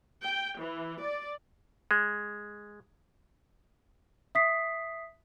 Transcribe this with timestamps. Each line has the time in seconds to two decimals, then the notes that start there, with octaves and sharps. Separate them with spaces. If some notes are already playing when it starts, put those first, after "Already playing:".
0.22 G5
0.59 E3
1.02 D5
1.91 G#3
4.35 E5 D#6 B6 C7